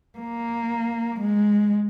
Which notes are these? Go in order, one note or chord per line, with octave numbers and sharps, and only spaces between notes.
A#3
G#3